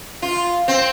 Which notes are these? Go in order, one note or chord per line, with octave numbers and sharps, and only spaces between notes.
F4
C4